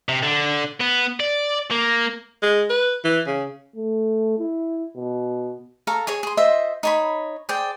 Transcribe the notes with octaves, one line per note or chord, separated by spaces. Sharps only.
C3
D3
B3
D5
A#3
G#3
B4
E3
C#3
A3
E4
B2
A4 F5 A#5 C#6
G#4 C#5 G#5
G#4 C6
F4 C5 D#5 E5
D#4 C#5 B5
G#4 C5 D5 G5